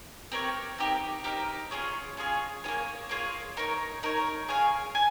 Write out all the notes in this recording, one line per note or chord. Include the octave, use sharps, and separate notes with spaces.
C4 G4 A#4 C#5
C4 D#4 G4 A#4
C4 D#4 G4 A#4
C#4 F4 G#4 C#5
C#4 F4 G#4 C#5
A#3 F4 G#4 C#5
A#3 F4 G#4 C#5
D#4 A#4 C#5
D#4 A#4 C#5
G#4 C#5 F5 G#5
G#5